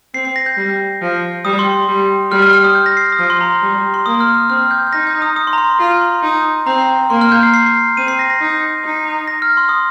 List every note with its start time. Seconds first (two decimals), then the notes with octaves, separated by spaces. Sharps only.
0.14 C4 C7
0.25 C7
0.36 A#6
0.46 G6
0.57 G3
1.02 F3
1.45 G3 D#6
1.59 C6
1.74 C6
1.88 G3
2.31 G3 F6
2.42 F6
2.53 F6
2.64 D#6
2.75 G6
2.86 A#6
2.97 C7
3.13 D#6
3.19 F3 F6
3.30 C6
3.41 A#5
3.51 C6
3.62 G3
3.94 C6
4.06 A#3 D#6
4.20 F6
4.35 D#6
4.49 C4 F6
4.71 G6
4.87 G6
4.93 D#4 A#6
5.07 G6
5.22 D#6
5.36 D#6
5.47 C6
5.53 A#5
5.58 C6
5.69 A#5
5.79 F4 C6
6.01 C6
6.23 D#4
6.67 C4 A#5
7.10 A#3 C6
7.21 F6
7.32 G6
7.43 C7
7.54 C7
7.97 C4 D#7
8.08 C7
8.19 A#6
8.30 A#6
8.41 D#4
8.84 D#4
9.28 A#6
9.42 F6
9.57 C6
9.69 D#6